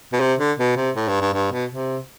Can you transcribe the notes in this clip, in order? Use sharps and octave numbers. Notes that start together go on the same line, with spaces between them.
B2
C3
D3
B2
C3
A2
G2
G2
G2
B2
C3